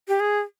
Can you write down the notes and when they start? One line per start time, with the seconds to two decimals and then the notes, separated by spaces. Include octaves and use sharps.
0.08 G4
0.20 G#4